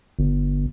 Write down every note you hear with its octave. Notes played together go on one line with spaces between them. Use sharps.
G1